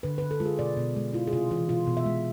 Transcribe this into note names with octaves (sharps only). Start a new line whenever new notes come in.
D3 B4
D3 B4
A4
G#3 F4
G#4
B2 D5
B2
G#3
E4 F4
G#4
C3 F4
E3 F4
B2 F4
B2
E5
G#3